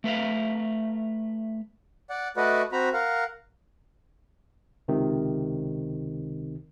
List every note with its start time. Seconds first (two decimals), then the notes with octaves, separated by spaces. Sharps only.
0.04 A3 B4 E5 F5
2.10 D5 F#5
2.37 A3 F#4 B4 D5 D#5 F#5
2.72 C4 F#4 A#5 B5
2.94 A#4 F5 F#5
4.88 C#2 C3 D#3